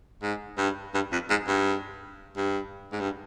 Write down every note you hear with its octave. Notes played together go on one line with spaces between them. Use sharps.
G#2
G2
G2
F2
G#2
G2
G2
G#2
G2